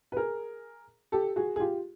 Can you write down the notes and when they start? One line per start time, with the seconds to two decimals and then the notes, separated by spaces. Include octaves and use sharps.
0.12 B4
0.16 G#4 A#4
1.12 G4 A4
1.36 F#4 G#4
1.56 G#4
1.60 F4 G4